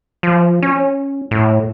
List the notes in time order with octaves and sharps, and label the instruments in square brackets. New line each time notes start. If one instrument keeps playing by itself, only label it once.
[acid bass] F3
C#4
A2